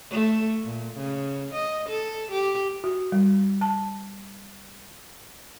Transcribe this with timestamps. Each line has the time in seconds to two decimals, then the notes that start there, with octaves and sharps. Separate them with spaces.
0.11 A3
0.64 A#2
0.97 C#3
1.53 D#5
1.89 A4
2.31 G4
2.84 F#4
3.12 G3
3.61 A5